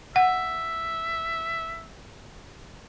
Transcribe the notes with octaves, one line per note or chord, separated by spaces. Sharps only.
E5 F#5